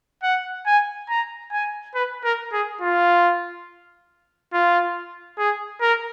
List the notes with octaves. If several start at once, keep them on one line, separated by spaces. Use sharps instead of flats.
F#5
G#5
A#5
G#5
B4
A#4
G#4
F4
F4
G#4
A#4